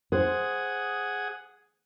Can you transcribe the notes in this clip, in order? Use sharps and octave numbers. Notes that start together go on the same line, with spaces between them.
G#4 C5 F#5 D#6